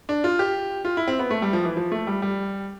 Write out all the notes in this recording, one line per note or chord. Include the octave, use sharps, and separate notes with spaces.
D4
F4
G4
F4
E4
C4
B3
A3
G3
F3
E3
F3
A3
G3
G3